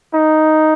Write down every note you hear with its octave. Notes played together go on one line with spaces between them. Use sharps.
D#4